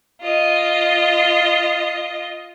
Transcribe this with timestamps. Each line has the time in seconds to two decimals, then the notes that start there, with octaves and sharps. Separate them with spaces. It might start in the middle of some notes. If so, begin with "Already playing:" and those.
0.21 F4 D#5